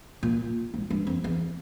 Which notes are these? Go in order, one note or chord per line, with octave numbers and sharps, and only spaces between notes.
A#2
G#2
G2
F2
E2